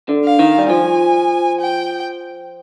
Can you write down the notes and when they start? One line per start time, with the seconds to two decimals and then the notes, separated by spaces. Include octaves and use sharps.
0.09 D3
0.24 F5
0.39 D#3
0.58 G3
0.70 F3 G#5
1.61 G5